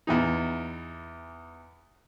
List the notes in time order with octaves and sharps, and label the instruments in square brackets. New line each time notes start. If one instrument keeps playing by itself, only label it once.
[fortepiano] E2 E3 D#4